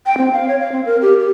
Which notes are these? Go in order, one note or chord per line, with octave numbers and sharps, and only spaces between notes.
G5
C4
F5
C#5
F5
C4
A#4
G4
G4